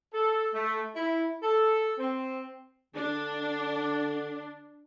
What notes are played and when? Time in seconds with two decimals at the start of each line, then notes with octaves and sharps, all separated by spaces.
0.13 A4
0.54 A3
0.96 E4
1.43 A4
1.99 C4
2.95 D3 D4